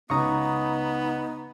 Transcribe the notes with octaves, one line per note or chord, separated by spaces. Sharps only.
C#2 B3 D#4 A#5 C#6 D#6